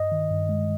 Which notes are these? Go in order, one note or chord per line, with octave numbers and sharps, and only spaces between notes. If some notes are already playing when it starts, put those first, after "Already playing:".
Already playing: G2 D#5
D#3
G2
G#3